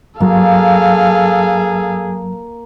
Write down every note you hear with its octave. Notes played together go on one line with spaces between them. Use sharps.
G2 F#3 A#3 G#4 A4 F5